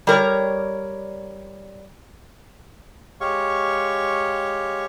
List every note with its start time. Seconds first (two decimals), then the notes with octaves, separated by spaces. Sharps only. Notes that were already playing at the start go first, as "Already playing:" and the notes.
0.07 G3 A#4 C#5
3.20 G#3 G4 C#5 F5 C#6